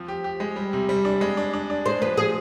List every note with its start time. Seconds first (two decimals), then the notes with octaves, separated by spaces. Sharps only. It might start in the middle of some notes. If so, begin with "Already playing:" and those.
Already playing: F3 C4
0.08 G4
0.24 G4
0.40 G#3
0.56 G3
0.73 C3
0.89 G3
1.05 D4
1.21 G#3
1.37 D4
1.53 D4
1.70 D4
1.85 G#3 C5
2.01 F3 B4
2.17 F3 G#4